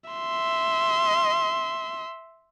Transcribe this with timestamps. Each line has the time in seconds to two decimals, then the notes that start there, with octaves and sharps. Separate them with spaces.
0.10 E5 C6